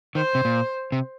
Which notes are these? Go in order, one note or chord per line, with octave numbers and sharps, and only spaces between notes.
D#3 C5
C3
A#2
C3